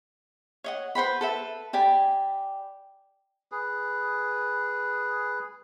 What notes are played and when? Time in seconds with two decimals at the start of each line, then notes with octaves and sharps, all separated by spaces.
0.64 C#5 D#5 F#5
0.95 B4 C5 F#5 B5
1.21 A4 B4 E5
1.73 G4 D5 G#5 B5
3.52 G#4 B4